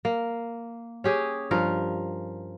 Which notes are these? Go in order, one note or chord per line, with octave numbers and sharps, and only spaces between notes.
A#3
C#4 G4 G#4
G2 F3 A#4